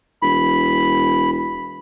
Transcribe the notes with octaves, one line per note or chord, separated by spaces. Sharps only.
E1 B5